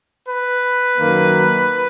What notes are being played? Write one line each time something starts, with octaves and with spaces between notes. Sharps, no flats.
B4
F#2 D#3 F#3 A#3